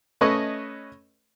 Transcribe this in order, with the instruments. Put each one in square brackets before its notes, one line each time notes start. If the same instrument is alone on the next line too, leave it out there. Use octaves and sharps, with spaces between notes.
[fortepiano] A3 C#4 B4 C#5 D#5